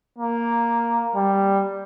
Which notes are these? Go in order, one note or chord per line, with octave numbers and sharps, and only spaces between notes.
A#3
G3